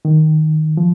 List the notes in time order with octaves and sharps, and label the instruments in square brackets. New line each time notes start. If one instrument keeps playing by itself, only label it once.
[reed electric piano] D#3
F3